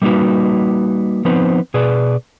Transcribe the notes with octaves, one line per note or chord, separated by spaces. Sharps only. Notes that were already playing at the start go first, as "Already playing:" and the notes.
G3 A3 A#3 D#4 F#4 B4
F3 B3 C4 D#4 B4 C5
B2 G#4 B4 D5